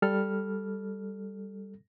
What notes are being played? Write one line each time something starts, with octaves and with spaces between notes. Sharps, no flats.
G3 A4 F6